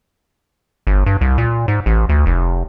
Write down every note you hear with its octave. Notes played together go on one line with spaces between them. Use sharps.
G1
G2
C2
A#2
G#2
A1
D2
F1